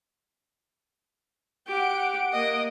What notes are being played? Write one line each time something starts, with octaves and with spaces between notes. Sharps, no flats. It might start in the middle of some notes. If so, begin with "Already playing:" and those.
G4 F#5 D7
A#3 D#5